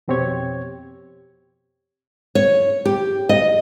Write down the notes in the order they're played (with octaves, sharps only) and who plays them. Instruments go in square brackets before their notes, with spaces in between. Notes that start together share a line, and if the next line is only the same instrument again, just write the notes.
[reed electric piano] F2 B2 C4 G4 C#5 G#6
[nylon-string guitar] C#5
G4
D#5